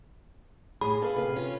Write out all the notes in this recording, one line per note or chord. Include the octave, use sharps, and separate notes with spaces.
A2 G#4 B5
A4 B4 F5
C3 B4 F5
C#4 F4